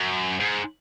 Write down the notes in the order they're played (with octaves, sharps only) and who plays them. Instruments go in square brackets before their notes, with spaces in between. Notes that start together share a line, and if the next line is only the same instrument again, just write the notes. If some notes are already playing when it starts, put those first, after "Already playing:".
Already playing: [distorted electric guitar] F#2
G#2